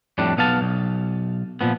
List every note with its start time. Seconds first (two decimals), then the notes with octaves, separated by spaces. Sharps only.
0.18 F2 A2 G3 D4
0.37 B1 B3 F5 A5
0.61 B1
1.61 A#2 F3 B3